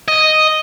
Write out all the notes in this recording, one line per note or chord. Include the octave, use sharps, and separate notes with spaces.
D#5